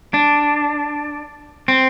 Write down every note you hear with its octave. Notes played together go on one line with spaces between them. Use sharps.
D4
C4